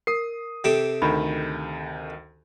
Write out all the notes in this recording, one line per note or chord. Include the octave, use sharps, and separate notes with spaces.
A#4 D#6 C7
C3 G4 A4
D2 D#3 B5